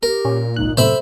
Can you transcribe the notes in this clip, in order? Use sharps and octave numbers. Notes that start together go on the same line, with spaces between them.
G4 A#4
A#2 C#4
G#1 C#2 D#4 F#6
F#2 A2 C3 A4 C5 E5 B5